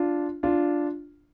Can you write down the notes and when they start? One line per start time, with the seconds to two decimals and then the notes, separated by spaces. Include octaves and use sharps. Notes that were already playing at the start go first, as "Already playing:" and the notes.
Already playing: D4 F4
0.43 D4 F4